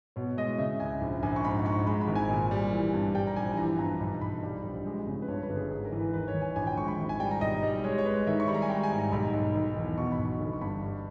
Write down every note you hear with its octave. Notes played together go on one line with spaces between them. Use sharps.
B2 C#5
G#3 D#5
C#3 E5
C#2 G#5
A#1
A#1 G#5
C#6
G#2 B5
G#2 C#6
G#3 B5
B5
G#1
G#5
A#2
G3
E3
G2
G3 G5
A#5
A#1 G#5
E3 A#5
G2 A#5
B1 B5
B1 B5
G3
A#1
G#3
C#3
B4
G2 C#5
B4
G1
G#4
G#2 G#4
A#4
E3
B4
D#2 B4
C#5
D#2
G#5
A#1 G#5
G5
G#3 C#6
B5
G#1
G#5
G3 G5
A#5
B1 D#5
G3
G#3 C#5
C#5
G#3 B4
D#3 E5
C#6
G3 B5
A#5
G#5
G#3 G5
G#5
G#2
A#5
B1 B5
B1
D#3
E2
B2 C#6
B5
B1
B5
G1
C#6
G2 B5
G3